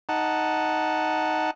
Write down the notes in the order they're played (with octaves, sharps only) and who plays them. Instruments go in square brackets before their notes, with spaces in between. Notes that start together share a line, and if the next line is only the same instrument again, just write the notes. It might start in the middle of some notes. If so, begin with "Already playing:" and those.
[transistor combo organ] D#4 F#5 A5